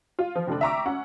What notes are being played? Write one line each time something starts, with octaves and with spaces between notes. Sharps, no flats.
F4
F3
F1 D3 D4
E5 G5 A#5 C#6 D6 E6
C#4 F#5